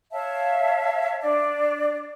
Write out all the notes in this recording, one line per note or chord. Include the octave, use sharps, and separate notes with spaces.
C#5 E5 F5 A5
D4 D5